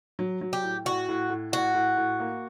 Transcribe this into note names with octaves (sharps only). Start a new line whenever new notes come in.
F#3
F#3
G4
A2
A2 F#4
A2
A2
A2 F#4
A2
A2
A#3